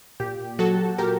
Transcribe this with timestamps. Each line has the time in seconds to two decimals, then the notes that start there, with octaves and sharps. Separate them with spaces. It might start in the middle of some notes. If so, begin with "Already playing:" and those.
0.20 A#2 G4
0.59 F#3 F#4 A4
0.98 A#2 G4 A#4